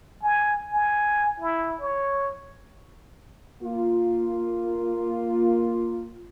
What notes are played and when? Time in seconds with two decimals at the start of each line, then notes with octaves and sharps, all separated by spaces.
0.22 G#5
0.71 G#5
1.40 E4
1.81 C#5
3.63 A#3 F4